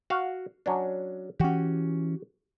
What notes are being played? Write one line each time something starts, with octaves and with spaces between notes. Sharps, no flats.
F#4 F5
F#3 C#4 D4
E3 C#4 F#4 G4